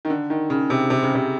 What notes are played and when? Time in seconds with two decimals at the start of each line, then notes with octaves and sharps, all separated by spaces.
0.05 D#3
0.10 D3
0.30 D#3
0.50 C#3
0.70 C3
0.90 C3
1.03 C#3
1.15 C3